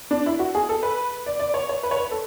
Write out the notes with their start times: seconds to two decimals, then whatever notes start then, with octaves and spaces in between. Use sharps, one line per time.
0.11 D4
0.26 E4
0.39 F#4
0.55 G#4
0.69 A4
0.83 B4
1.26 D5
1.40 D5
1.54 C#5
1.69 C#5
1.83 B4
1.91 C#5
1.97 B4
2.11 A4